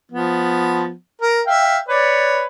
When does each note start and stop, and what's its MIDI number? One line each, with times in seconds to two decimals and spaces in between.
0.12 0.92 53
0.12 0.92 59
1.22 1.42 70
1.47 1.78 76
1.47 1.78 77
1.47 1.78 79
1.89 2.46 71
1.89 2.46 73
1.89 2.46 74